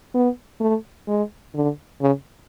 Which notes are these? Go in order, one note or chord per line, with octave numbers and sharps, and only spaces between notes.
B3
A3
G#3
D3
C#3